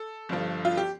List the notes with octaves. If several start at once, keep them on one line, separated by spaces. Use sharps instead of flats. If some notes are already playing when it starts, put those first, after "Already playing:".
Already playing: A4
G1 G2 F3
F4
G4